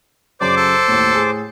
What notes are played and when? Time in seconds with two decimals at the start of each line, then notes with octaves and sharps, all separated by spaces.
0.41 F#2 C#3 F#3 C5 D5 D6
0.57 A4
0.88 D#2 A2
1.12 A2 G#4 C7